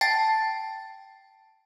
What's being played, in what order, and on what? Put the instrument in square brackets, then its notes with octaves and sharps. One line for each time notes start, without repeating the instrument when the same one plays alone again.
[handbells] G5 A5 A6